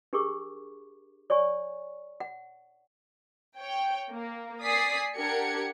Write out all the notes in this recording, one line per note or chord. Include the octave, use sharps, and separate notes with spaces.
D4 G4 G#4 A#4 C#6 D6
C#5 D5 G#5 C#6
F#5
C#5 G5
A#3
D5 G#5 D#6 B6 C7
D4 G4 A#4 F#5 G#6 C#7